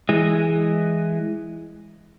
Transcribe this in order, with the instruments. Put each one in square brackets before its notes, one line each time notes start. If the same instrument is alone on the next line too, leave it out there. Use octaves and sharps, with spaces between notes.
[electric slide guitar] E3 G#3